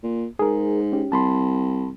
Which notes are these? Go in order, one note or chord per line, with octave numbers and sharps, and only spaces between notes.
A#2
G#2 G#4 A#4
C#4 G4
C2 A5 B5 C6